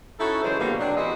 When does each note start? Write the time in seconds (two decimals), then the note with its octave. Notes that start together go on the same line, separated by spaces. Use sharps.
0.20 C#4 D#4 E4 F#4 A4
0.43 C#3 E3 F#3 G#3 C5
0.60 B2 D3 F3 G3 A#3 B3
0.79 C3 F#3 G#3 D4
0.97 E3 G#3 B3 C4 F#4 D#5